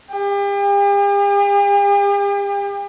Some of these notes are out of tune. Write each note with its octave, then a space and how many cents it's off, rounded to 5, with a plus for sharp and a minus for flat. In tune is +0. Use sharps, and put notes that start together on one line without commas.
G4 +45